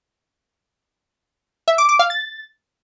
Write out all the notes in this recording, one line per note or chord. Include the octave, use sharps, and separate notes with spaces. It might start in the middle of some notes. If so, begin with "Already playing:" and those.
E5
D6
D6
F5
A6